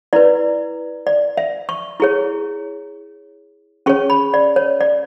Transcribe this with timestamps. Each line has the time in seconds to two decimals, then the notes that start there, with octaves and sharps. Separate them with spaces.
0.13 E4 B4 D5
1.07 D5
1.37 E5
1.69 C#6
2.00 E4 G#4 C#5 C#6
3.86 C#4 G#4 C#5 C#6
4.10 B5
4.34 D5
4.56 C#5
4.81 D5